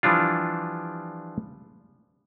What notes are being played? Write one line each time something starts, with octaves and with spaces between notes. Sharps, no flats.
E3 F3 G3 D4 F4